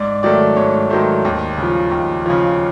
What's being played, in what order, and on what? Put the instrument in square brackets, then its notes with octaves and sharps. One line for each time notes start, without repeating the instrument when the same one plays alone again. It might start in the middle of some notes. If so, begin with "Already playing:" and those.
Already playing: [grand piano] G#2 D5
D#3 F#3 A3 D5
G#2 C#5
D#3 F#3 A3 C5
D#2
C#3
F3
D#2
C#3 F3